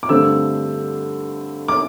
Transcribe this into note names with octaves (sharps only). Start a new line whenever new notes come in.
D6
G2 D3 A3 C4 E6
D6